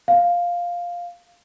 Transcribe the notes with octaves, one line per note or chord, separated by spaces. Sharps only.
F5